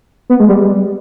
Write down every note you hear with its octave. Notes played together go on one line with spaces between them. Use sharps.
B3
G#3
G3